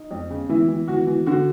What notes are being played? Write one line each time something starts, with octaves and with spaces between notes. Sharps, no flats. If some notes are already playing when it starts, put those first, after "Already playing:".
Already playing: D#4
F2
C#3
E3 E4
E3
E3 F#4
E3
D3 F#4